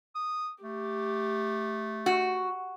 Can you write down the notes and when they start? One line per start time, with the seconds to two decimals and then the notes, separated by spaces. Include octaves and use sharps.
0.15 D#6
0.63 A3 G4
2.06 F#4